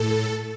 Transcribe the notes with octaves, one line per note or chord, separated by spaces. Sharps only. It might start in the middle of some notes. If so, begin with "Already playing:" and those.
Already playing: A2 A4